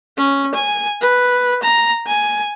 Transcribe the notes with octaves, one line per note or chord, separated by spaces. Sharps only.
C#4
G#5
B4
A#5
G#5